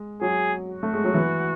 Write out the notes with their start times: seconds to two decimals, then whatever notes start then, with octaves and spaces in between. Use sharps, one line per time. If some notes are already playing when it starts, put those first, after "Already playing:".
Already playing: G#3
0.21 F#3 G#4
0.68 F#4
0.83 A3
0.93 G#3
1.04 F#3
1.14 E3